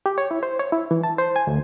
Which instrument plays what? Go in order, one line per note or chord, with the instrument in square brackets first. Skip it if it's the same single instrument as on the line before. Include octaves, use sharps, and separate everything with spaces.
[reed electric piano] G4
C#5
E4
C5
C#5
E4
E3
A5
C5
G#5
D2